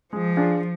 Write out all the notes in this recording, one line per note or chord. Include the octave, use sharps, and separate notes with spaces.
F3 G#3
D4 F4 G#4